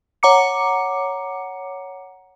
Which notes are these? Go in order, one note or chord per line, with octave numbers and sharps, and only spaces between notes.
C#5 F#5 A#5 D6 C#7